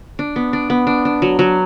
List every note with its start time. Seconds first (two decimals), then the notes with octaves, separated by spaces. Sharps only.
0.19 D4
0.36 B3
0.53 D4
0.70 B3
0.87 D4
1.05 D4
1.22 F#3
1.39 F#3